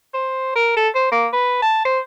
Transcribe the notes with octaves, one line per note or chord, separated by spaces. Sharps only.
C5
A#4
A4
C5
A#3
B4
A5
C5